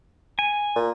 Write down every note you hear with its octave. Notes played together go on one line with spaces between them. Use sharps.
G#5
A#2